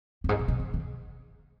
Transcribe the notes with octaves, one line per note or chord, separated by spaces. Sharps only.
G2
G#2
A#2
C3
C#3
D#3